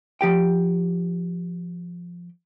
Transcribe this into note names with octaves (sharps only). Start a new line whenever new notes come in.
F3 G4 G5